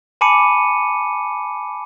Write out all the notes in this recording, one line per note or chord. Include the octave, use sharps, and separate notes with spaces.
G#5 A5 B5 D6 C#7 D#7